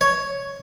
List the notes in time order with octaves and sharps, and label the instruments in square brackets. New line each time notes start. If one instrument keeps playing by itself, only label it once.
[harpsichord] C#5